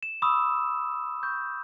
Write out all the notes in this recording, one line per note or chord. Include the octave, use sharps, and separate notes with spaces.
E7
B5 C#6 D#6 E6
C#6 G6